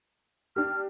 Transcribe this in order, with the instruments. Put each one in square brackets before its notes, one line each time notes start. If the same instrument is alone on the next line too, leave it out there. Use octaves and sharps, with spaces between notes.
[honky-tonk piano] D4 G4 [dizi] F6